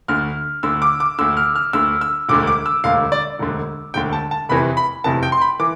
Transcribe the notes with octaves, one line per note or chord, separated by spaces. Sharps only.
D2 D3 F6
D2 D3 E6
D6
D6
D2 D3 E6
F6
F6
D2 D3 E6
E6
E1 D2 D3 D6
D6
E6
E1 D2 D3 F5
D5
E1 D2 D3
E1 D2 D3 G5
A5
A5
F1 E2 C3 E3 B5
B5
F1 E2 C3 E3 A5
G5
C6
B5
E3 D6